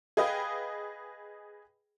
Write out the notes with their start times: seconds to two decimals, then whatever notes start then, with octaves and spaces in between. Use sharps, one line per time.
0.17 G#4 B4 D#5 F5 G5